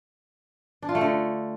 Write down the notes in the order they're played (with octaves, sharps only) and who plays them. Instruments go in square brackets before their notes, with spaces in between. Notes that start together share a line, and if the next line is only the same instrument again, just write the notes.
[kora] D4
F4
A3
D3